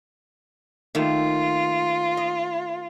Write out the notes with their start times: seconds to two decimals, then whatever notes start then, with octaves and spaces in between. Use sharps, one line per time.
0.95 D#3 A3 A#3 F4
2.17 D#5